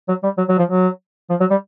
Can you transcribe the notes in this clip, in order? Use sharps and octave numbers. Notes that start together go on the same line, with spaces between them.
F#3
G3
F#3
F#3
F3
F#3
F3
F#3
G3